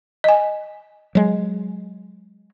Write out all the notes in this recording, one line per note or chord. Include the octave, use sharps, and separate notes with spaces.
D#5 G#5
F#3 G#3